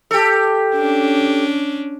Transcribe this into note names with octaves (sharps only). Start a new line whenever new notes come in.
G4 A4
C#4 D4